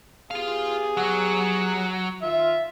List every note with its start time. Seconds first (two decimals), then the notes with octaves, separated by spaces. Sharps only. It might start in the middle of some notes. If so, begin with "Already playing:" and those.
0.31 B3 F4 G4 G#4 F5
0.97 F#3 F#5
2.22 D#3 F4 E5